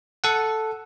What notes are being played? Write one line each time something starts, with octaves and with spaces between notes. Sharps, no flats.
A4 F#5